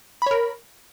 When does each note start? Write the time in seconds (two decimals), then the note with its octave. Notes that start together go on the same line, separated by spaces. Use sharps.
0.22 B5
0.26 C#5
0.31 A#4